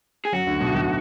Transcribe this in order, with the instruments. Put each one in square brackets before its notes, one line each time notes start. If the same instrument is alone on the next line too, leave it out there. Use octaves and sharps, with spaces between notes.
[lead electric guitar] G#4
[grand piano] F#2 F#3 [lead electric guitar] F#4
[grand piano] D2 D3
B1 B2
A2
B1 B2